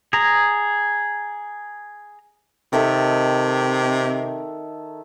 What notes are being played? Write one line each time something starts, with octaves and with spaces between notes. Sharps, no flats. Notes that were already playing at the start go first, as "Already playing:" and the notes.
G#4 A#5
C3 D#3 A4 E5